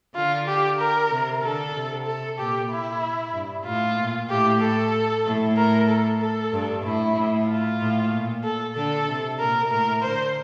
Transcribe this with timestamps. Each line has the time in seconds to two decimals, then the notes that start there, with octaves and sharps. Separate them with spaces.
0.15 D3 F4
0.48 G4
0.79 A#4
1.11 C3
1.43 D3 A4
1.75 C3
2.07 A4
2.39 A#2 G4
2.70 E4
3.34 G2
3.66 A2 F4
3.98 A#2
4.30 A2 G4
4.61 A4
5.26 A2
5.57 A#4
5.89 A4
6.21 A4
6.52 G2
6.84 A2 E4
7.17 A2
7.48 F4
7.81 A2
8.12 A#2
8.44 A4
8.76 D3 A4
9.08 C3
9.40 A#2 A#4
9.71 A2 A#4
10.03 D3 C5